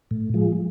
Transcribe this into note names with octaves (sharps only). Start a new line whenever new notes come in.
A2
F3 G#3